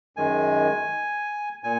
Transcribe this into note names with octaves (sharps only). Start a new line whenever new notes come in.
F#2 D#3 G#3 G#5
A#2 G#5